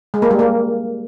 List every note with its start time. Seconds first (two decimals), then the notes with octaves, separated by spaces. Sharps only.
0.14 G#3
0.22 A#3
0.31 G3
0.39 A#3